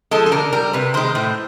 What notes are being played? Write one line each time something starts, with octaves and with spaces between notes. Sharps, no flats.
F3 G#3 A4
A4
D3 A#4
G3 A#4
C3 B4
D#3 G#3 C5
A2